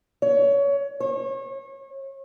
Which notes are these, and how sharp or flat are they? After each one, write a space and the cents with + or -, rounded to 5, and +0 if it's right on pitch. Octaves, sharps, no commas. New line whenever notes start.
C#5 +25
C#5 -35